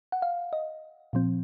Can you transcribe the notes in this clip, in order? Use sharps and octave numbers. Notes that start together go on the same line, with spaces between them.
F#5
F5
D#5
A#2 F3 C4